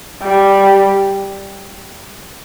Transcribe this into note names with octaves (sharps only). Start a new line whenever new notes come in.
G3